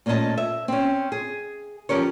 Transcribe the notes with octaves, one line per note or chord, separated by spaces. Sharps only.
A#2 A3 C#4 G#4 D#5 A5
E5
C4 C#4
G#4
F3 C#4 G4 A#4 C#5